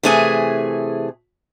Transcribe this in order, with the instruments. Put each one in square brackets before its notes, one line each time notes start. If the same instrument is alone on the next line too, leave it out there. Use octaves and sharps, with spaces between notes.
[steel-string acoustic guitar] C3 E3 A3 G#4 G#5